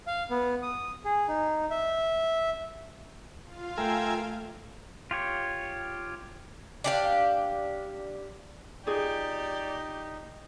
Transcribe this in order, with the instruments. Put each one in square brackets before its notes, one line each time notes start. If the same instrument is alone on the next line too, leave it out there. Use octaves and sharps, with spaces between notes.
[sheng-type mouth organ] F5
B3
D#6
G#4
D#4
E5
[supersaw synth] F4 F5
[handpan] A3 A4 [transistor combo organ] A#4 E5 G#5 [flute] G5
[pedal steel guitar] F4 G4 C#5
[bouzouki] D4 G4 F5
[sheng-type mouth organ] D#4 [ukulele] F4 G#4 [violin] G4 [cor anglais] D5